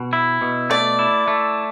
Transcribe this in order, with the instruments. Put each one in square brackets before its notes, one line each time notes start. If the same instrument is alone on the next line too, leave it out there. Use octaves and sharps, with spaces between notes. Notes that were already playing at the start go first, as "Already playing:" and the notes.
Already playing: [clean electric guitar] B2
E4
B2
[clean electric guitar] A3 [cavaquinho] D5
[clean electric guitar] E4
A3